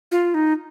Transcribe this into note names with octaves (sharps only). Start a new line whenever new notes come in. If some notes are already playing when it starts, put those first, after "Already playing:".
F4
D#4